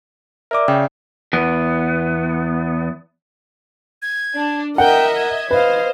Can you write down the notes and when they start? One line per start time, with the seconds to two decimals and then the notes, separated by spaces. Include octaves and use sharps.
0.51 A#4 D5 E5 D6
0.68 C#3 G5
1.33 E2 B3
4.02 G#6
4.37 D4
4.78 A#4 D#5 E5 F#5 G5
5.16 G#6
5.51 B4 C5 D#5 F5